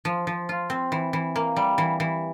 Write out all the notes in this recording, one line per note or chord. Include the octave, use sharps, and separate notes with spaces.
F3
F3
F4
C4
E3
E3
A#3
G3
E3
E3